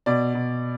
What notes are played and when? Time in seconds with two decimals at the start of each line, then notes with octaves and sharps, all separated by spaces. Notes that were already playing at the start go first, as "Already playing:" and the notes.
0.06 B2 D5
0.34 B2